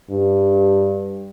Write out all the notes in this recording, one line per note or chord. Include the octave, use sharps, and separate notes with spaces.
G2